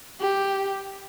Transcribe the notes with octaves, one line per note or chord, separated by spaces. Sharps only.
G4